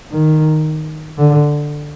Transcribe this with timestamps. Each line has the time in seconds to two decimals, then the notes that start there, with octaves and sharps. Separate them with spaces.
0.11 D#3
1.18 D3